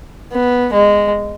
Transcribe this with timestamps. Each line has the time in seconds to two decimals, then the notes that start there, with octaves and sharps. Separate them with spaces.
0.32 B3
0.73 G#3